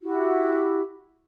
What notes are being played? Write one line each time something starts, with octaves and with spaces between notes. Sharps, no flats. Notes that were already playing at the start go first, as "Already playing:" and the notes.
E4 F#4 G4